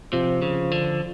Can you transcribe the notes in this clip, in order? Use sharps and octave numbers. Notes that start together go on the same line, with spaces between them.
C3 F3
C#3
D3